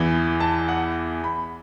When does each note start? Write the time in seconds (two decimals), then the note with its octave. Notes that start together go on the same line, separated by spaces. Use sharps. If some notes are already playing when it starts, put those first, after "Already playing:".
Already playing: E2 E3
0.40 A5
0.69 F#5
1.24 B5